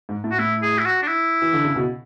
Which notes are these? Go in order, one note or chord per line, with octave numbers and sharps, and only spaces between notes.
G#2
A2
F#4
A2 E4
G#4
E4
F#4
D4
E4
E3
D3
C#3
B2